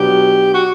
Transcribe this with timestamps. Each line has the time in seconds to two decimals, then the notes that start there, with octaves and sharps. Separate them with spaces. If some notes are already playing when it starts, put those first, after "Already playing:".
Already playing: B2 F#3 B3 D4 G4
0.53 F#4